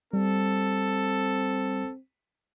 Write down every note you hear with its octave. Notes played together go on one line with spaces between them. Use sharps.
G3 C4 A4